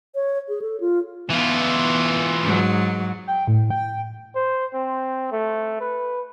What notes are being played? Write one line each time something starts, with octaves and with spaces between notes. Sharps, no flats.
C#5
G#4
A4
F4
E3 B3 F4
G#2 F#3
G5
A2
G5
C5
C4
A3
B4